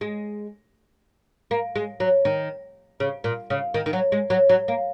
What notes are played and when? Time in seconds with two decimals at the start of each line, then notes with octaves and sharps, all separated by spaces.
0.01 G#3
1.51 A#3
1.76 G#3
2.00 F#3
2.25 D#3
3.00 C#3
3.24 A#2
3.50 C#3
3.74 D#3
3.86 D#3
3.93 F#3
4.12 G#3
4.30 F#3
4.49 F#3
4.68 A#3